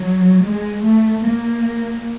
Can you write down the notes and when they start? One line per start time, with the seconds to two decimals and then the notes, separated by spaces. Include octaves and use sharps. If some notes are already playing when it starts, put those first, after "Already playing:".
Already playing: F#3
0.45 G#3
0.84 A3
1.25 A#3